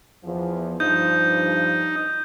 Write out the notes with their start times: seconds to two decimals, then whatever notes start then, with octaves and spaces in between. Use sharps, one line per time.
0.24 E2 F3
0.80 G2 F3 D#4 G6